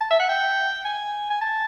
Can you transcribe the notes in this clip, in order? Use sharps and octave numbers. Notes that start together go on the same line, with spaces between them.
A5
E5
F#5
G5
G#5
G#5
A5